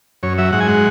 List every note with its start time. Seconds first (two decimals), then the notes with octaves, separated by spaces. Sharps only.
0.23 F#2 C#5
0.38 F#3 E5
0.53 G#2 F#5
0.60 G#5
0.68 G#3 F#5